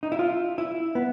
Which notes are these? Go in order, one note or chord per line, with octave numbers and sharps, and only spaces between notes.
D#4
E4
F4
E4
B3